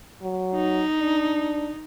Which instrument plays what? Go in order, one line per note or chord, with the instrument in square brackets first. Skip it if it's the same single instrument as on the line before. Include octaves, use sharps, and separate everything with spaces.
[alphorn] F#3
[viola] D#4
[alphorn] D4